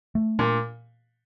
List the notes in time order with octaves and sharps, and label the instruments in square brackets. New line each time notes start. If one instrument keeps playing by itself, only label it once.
[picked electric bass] A3
[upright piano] A#2 [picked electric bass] D4